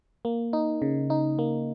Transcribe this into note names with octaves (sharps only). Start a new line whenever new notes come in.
A#3
D#4
C#3
D#4
A#3